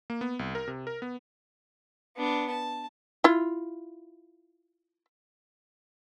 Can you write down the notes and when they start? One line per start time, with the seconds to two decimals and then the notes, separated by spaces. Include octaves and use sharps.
0.10 A#3
0.21 B3
0.39 C2
0.55 A#4
0.68 C3
0.87 A#4
1.02 B3
2.17 B3 D4
2.50 A5
3.24 E4 F4